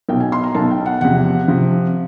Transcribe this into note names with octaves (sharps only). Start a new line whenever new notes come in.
B1 B2 G5
G#5
C6
A#5
B1 B2 A5
G5
F#5
E2 C3 F3 F#5
C3 F3